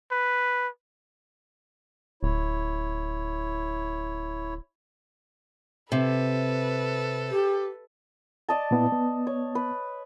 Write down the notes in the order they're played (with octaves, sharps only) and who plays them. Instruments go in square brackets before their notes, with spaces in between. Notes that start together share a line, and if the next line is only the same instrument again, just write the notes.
[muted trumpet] B4
[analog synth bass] D1 [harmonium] E4 C#5
[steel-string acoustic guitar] C3 [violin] A4 B4
[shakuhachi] G4
[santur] D5 D#5 A5
[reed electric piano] A#2 B3 E4
B3
[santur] C#5
B4